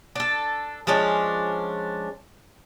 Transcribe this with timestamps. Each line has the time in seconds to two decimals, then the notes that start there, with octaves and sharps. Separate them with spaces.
0.16 D4 A4
0.87 F3 G#3 C#4 D4